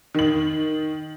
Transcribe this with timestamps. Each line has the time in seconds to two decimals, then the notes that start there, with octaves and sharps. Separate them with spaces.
0.14 D#3 F#7